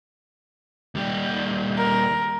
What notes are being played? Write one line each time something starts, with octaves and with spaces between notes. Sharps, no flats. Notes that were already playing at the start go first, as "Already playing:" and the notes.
D#2 G3
A#4